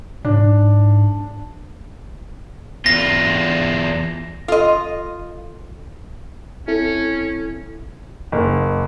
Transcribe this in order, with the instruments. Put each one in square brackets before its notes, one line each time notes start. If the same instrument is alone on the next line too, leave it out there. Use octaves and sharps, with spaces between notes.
[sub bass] G#2 [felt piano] D4
[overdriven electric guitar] E2 F4 [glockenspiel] A#6
[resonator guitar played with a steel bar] F4 D#5 [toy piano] A4 C6
[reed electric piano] C4 E4 A4 [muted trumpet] C#4
[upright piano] F#1